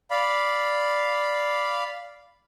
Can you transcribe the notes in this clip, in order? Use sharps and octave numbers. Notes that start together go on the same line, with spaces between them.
D5 F5 B5